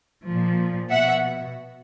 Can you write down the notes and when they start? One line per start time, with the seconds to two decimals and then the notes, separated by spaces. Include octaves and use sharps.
0.25 A#2 F3
0.90 B2 E5 F#5